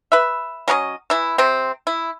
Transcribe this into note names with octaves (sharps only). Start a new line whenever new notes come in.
B4 E5
F#3 C#4 A#4 D#5
E3 E4
C3 C4
E4